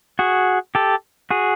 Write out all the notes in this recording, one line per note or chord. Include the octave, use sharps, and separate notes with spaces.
F#4 G#4
G4 A4
F#4 G#4